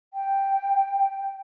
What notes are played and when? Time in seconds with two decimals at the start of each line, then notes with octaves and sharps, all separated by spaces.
0.14 G5